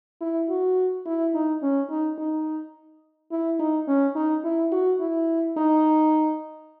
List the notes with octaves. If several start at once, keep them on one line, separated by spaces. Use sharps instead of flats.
E4
F#4
E4
D#4
C#4
D#4
D#4
E4
D#4
C#4
D#4
E4
F#4
E4
D#4